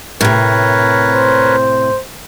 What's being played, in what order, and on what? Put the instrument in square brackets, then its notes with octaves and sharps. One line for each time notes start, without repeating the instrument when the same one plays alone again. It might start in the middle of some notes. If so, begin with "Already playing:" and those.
[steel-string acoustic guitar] A2 C3 [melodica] A#4 B4 C#5
[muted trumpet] C5